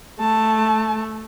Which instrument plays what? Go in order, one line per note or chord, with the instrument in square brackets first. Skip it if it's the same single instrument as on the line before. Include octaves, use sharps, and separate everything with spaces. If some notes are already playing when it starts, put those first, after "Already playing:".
[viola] A3 [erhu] A5